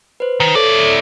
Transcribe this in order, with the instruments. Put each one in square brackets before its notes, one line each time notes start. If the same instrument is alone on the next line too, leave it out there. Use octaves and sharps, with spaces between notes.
[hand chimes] B4 C5
[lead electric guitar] D#3
[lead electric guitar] E4 D5 [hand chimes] A4 C#5